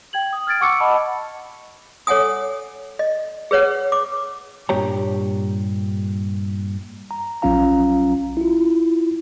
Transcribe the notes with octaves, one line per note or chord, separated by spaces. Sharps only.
G5 G#6 F#7
D#6
F6 G#6 A6 D7
F#5 C#6 D6 E6 C#7
D#5 F#5 A5 B5
A4 C#5 F#5 G#5 D#6
D#5
G#4 B4 C#5 F#5
D6
G2 A#2 G4 C#5 A#5
A#5
A#1 F#3 C#4 F4 F5 A#5
E4 F4